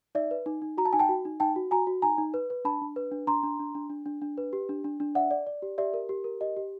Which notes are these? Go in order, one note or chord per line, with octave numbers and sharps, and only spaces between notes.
D#4 D5 E5
B4
D#4
D#4
F#4 A#5
A5
D#4 G#5
G5 A5
F#4
D#4
D#4 G5 A5
F#4
F#4 G#5 A#5
F#4
D#4 G#5 A#5
D#4
B4
B4
D4 A5 B5
D4
B4
D4
D4 A#5 C6
D4
D4
D4
D4
D4
D4
B4
G4
D4
D4
D4
D5 E5 F#5
D5
D5
G4
G4 D5 E5
A#4
G4
A#4
G4 D#5
G4